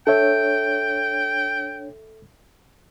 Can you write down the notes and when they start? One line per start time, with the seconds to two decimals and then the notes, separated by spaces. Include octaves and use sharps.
0.07 D4 A4 C#5 E5 G5